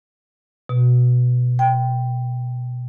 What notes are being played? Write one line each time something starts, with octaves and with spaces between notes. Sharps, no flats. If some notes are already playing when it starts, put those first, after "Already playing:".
B2
G5